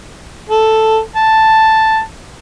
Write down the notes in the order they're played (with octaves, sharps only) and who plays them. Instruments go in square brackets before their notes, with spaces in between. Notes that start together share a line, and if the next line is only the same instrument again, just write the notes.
[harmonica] A4
A5